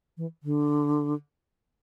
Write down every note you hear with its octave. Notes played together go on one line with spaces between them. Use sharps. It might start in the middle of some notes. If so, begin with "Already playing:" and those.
E3
D3